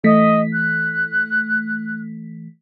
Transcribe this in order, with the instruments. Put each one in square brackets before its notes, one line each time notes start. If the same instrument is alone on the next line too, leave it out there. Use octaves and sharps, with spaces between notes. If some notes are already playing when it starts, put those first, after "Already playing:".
[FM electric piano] E3 A3 B6 [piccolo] D#5
[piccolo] F#6